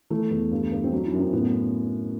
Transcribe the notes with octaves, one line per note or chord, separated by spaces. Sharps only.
E3 A3
E2
G2
G2
C4
F#3 D4
E4
F#2
C4
A2 B3